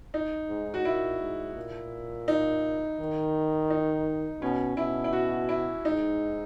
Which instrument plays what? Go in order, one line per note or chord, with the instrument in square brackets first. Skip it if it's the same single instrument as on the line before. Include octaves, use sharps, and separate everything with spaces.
[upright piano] D#4
[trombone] G#2
[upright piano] F#4
[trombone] A#2 [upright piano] E4
[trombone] G#2
A#2
[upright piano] D#4
[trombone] D#3
[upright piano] D#4
[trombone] B2 [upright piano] C#4
[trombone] B2 [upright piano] E4
[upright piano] E4
F#4
E4
[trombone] G#2 [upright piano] D#4